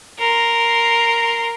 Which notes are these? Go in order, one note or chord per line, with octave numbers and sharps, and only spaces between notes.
A#4 C6